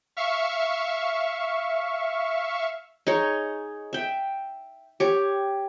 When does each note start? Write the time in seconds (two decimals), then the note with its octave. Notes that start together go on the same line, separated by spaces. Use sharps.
0.17 E5 F5 C#6
3.07 D#4 G#4 C#5
3.93 E5 G5
5.00 G4 C#5